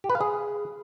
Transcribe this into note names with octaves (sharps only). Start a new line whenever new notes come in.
G4
B4
F5
G#4